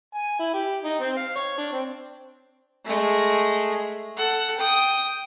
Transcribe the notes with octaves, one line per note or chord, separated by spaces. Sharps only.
G#5
E4
G4
D#4
C4
F5
C#5
D4
C4
G#3 A3
A4 F#5
G5 D#6